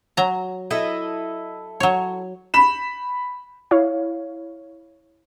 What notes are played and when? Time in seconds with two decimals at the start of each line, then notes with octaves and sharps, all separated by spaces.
0.17 F#3 A#5
0.70 E4 A4 D#5
1.80 F#3 C#5
2.54 B5 E7
3.71 E4 C#5 F5